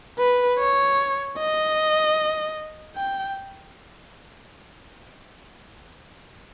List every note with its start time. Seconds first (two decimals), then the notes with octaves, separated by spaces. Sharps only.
0.19 B4
0.59 C#5
1.39 D#5
2.96 G5